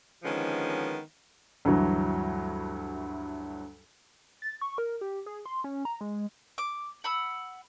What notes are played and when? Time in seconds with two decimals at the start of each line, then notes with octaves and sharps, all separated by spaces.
0.23 D3 D#3 F3 G#3 B3 C#4
1.65 D2 G2 E3 F#3
4.42 A6
4.61 C#6
4.78 A#4
5.01 G4
5.26 G#4
5.46 C6
5.64 C#4
5.85 A#5
6.01 G#3
6.58 D6
7.04 F#5 B5 E6